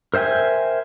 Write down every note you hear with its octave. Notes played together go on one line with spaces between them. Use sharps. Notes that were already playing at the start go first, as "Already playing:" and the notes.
A#4 C5 E5 G5 G#5